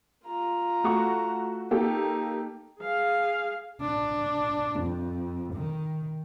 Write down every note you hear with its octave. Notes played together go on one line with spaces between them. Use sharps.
F4 A#5
A3 F#4 C#6
A#3 D#4 G4 A4
G#4 F5
D4
F2
D#3